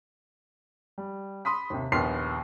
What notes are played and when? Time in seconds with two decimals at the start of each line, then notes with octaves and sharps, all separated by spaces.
0.98 G3
1.45 B5 C6 D#6 B6
1.70 D#2 C3
1.92 A#1 D#2 B3 C6 F6 C7